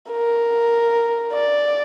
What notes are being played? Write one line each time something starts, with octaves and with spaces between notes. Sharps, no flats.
A#4
D5